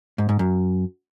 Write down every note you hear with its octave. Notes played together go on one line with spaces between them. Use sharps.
G#2
G#2
F#2